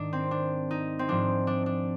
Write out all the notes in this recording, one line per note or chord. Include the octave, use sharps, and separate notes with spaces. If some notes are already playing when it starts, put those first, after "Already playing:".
Already playing: G#2 D#3 G#3 D4
C4
D4
D#4
C4
G#2 F3 G#3 D4
D4
D4